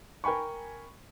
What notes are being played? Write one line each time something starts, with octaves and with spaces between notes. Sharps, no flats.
A#4 G5 G#5 B5 C#6